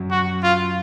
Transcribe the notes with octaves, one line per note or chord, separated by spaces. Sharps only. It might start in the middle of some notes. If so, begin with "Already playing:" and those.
Already playing: F#2 F#3
F#4
F4